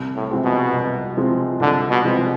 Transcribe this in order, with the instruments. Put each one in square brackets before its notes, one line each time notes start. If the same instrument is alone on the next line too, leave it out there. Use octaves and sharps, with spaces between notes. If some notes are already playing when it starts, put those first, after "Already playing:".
Already playing: [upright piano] C2
[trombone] A2
[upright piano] C3 F3 G#3 C4
[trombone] B2
[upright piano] C2
C3 F3 G#3 C4
[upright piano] C2 [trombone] D3
[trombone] B2
[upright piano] C3 F3 G#3 C4